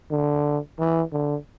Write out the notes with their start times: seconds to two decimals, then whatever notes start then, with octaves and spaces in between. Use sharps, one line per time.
0.11 D3
0.79 E3
1.12 D3